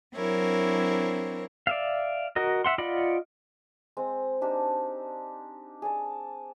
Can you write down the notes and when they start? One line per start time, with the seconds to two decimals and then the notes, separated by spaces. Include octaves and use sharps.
0.15 F#3 C4 D4 E4 A#4 C#5
1.67 D5 E5 F5
2.36 F#4 A#4 D#5
2.64 E5 F#5 C6
2.78 F4 D5 D#5 F#5 B5
3.97 G#3 C4
4.41 D4 D#4 G4 E6
5.82 G#4 D5 A5